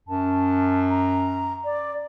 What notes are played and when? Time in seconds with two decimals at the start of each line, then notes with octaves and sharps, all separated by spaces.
0.08 F#2 A5
0.90 A#5
1.64 D5